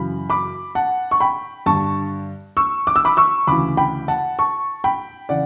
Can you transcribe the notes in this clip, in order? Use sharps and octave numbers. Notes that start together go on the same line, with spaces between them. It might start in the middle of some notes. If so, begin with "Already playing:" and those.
Already playing: F#2 C#3 E3 B5
B5 D6
F#5 A5
C#6
G5 B5
G2 D3 A5 C#6
C#6 E6
D6
E6
B5 D6
C#6 E6
D2 C#3 E3 B5 D6
G5 B5
F#5 A5
A5 C#6
G5 B5
C#3 E3 D5 F#5